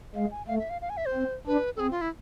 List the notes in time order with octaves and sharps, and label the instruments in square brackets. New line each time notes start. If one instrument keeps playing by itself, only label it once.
[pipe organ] G#3 [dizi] F5
[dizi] G#5
[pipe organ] A3 [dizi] F5
[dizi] E5
F5
F5
G#5
E5
C5
[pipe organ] C4
[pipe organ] D4 [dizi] B4
[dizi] A4
[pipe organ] C4 [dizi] G#4
[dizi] F4
E4